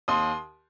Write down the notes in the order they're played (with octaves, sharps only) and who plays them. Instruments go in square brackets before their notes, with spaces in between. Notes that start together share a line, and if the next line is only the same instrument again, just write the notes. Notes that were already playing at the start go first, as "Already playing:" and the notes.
[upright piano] D#2 C6 D#6